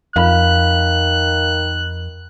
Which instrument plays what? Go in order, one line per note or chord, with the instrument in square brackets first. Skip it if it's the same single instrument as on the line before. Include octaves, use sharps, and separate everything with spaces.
[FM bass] F2 [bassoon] D#3 [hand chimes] F5 B5 [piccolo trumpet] F#6